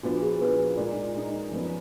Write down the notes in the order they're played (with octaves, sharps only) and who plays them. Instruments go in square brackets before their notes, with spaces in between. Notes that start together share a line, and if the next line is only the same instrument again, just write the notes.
[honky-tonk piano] A#2 F3 B3 D4 [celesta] F#4
[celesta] G#4
[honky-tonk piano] A#2 F3 B3 D4 [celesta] B4
[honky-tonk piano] A#2 G#3 D#4 [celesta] A#4 D5
[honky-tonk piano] A#2 G#3 D#4
F#2 F3 B3